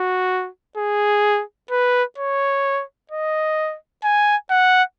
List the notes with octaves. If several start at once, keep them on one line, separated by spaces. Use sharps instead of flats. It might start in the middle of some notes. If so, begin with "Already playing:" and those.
Already playing: F#4
G#4
B4
C#5
D#5
G#5
F#5